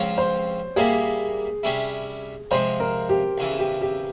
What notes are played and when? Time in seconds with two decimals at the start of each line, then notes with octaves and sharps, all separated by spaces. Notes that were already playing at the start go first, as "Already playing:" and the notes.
Already playing: C#2 C#3 F3 C4 F4 C#5
0.18 C5
0.76 A#2 G3 A#3 E4 G#4
1.63 C3 G3 C#4 E4
2.51 C3 F3 G#3 C5
2.80 A#4
3.09 G4
3.38 E2 C#3 E3
3.59 G4
3.81 G4